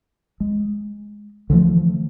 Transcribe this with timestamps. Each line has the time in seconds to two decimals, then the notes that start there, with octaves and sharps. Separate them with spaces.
0.40 G#3
1.50 D3 E3 F3 A3